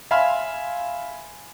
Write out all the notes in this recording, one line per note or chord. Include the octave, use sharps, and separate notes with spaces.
E5 F5 G#5 B5 C6 F6